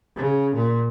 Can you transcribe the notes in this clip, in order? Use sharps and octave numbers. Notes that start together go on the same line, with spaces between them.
C#3
A#2